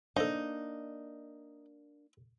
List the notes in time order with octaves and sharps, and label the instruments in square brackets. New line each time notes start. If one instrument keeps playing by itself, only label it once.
[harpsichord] F3 A4 [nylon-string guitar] A#3 D4 [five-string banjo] D#4